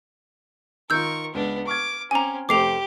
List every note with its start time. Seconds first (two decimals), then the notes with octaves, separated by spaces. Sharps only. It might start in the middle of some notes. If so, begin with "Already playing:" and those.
0.90 D#3 F4 A#4 C#6 E6 G6
1.34 C#2 B3 D4
1.67 C#6 D6 F6 G#6
2.11 C4 C#4 G#5 A#5 D6
2.49 F1 A3 G4 C5 D6 C7 F7